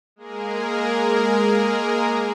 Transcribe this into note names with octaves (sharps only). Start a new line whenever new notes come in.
G#3 A#3 G#4 A#4